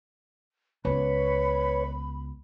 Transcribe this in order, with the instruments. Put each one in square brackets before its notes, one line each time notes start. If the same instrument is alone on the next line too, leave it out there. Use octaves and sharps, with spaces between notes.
[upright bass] C#2 B3 [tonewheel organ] B4 C#5 [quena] B5